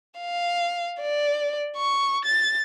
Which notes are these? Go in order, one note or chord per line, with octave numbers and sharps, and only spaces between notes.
F5
D5
C#6
A6